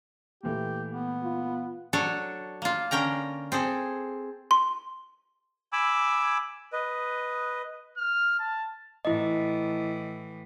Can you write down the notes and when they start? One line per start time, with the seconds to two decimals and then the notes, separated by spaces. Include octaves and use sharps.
0.43 A#2 E3 A3 G4
0.91 B3
1.23 F4
1.93 F#3 D4 A4 C#5
2.62 A#3 F4
2.91 D3 C#4 A#4 G5 A#5
3.52 C4 G#4 A4
4.51 C6
5.73 G#5 B5 D6 E6
6.73 B4 D#5
7.98 F6
8.39 A5
9.05 A2 E3 E4 D#5